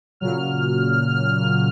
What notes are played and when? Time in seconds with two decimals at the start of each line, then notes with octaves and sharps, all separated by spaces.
0.20 A#2 C#3 F#3 F6